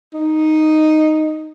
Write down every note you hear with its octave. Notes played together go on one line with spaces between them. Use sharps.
D#4